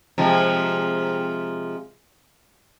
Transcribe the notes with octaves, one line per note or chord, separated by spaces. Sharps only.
C3 F3 G#3